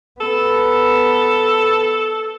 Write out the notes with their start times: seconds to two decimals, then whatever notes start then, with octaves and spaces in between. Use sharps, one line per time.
0.21 B3 A4